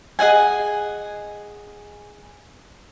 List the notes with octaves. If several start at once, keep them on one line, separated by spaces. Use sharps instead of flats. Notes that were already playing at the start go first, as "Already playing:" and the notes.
G#4 D#5 F#5 G#5